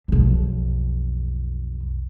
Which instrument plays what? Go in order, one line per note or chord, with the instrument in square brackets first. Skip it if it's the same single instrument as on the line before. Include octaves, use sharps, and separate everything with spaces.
[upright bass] B1 F2